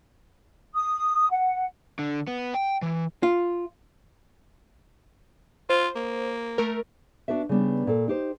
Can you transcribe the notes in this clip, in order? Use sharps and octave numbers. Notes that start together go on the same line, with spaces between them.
D#6
F#5
D3
B3
G5
E3
F4
F4 C5
A#3
A3 A#4
B3 D4 F#4 B4 E5
C#3 G3 B3 D4
A#2 A4
D#4 G4 C5